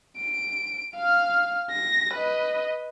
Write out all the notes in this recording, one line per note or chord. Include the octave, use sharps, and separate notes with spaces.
D7
F5 F6
A#6
B4 D#5